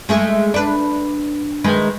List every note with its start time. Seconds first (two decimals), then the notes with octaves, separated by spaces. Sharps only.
0.09 G#3 A3 G#4
0.54 D4 B4
1.64 D#3 G#3 B4